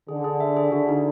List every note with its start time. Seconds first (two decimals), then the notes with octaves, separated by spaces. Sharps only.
0.08 D3 G#4
0.24 G#4
0.40 E5
0.57 G#4
0.72 D3 F#4
0.89 D#4